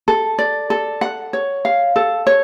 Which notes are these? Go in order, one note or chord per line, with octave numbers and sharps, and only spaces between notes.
A4
D5
A4
F#5
C#5
F5
A4
C#5